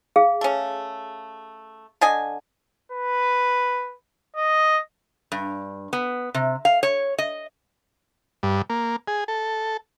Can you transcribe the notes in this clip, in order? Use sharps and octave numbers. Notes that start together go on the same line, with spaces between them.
G#4 F5
A3 C#4
D3 D#5 G#5
B4
D#5
G2
B3
C3
F5
C#5
D#5
G2
A#3
G#4
A4